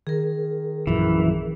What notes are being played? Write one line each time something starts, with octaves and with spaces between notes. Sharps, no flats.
D#3 G#4 A#4
A#1 F#2 E3